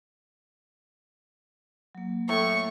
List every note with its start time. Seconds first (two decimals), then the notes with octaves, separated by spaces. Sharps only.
1.95 F#3 A#3
2.29 A2 C#6